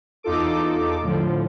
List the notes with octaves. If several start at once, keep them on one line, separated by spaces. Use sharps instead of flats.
E2 D#4 F4 A4 D6
A2 D3 F3